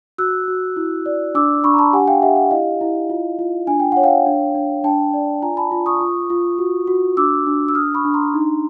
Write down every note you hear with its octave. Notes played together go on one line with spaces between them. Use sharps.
F#4 E6 F#6
F#4
E4
D5
D4 D6 E6
D4 B5 C#6
A#5
A5 B5
G4 F#5 G#5
F5 G5
G4 E5 F#5
E5 F#5
E4 D#5 F5
E4
F4
F4
D4 G#5
G5
C#5 F#5
F5 G5
D4
D4
D4 G5 A5
D5
F4 G#5 A#5
A5 B5
F4
C#6 D#6
F4
F4
F#4
F#4
D4 D6 E6
D4
E6
D4 D#6 F6
B5 C#6
D4
A#5 C6
D#4